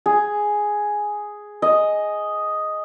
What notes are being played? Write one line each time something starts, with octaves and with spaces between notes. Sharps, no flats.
G#4
D#5